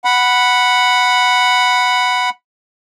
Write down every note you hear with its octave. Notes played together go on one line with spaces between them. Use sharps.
F#5 B5